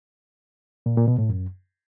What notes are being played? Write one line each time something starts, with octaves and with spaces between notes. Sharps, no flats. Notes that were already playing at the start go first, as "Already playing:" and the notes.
A#2
A#2
B2
A2
F#2